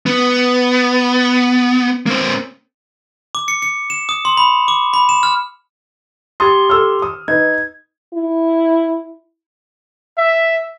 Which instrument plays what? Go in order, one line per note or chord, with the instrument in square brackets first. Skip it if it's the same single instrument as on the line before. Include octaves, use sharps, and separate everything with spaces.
[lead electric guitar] B3
A#3 C4
[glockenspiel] D6
C#7
C#7
E7
D#6
C6
B5
D6
B5
E7
F6
[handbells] G4 C6 [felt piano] D#6 A6
[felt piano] A4 E6 F6
D#6
[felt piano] D#4 B4 [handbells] G#6
[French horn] E4
[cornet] E5